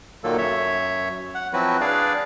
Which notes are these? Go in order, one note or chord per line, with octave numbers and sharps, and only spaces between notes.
A#2 D#3 F#3 A#3 A4
F#2 C#5 E5
F#5
F3 F#3 C4 E4 F#4 B4
D4 G#4 B4 D5 F5